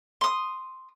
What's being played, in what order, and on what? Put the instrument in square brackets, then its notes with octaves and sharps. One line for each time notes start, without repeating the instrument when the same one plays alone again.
[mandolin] C6 D#6